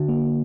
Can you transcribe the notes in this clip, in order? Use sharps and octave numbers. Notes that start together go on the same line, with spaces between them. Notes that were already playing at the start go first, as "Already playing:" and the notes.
Already playing: D3 F#4
A#3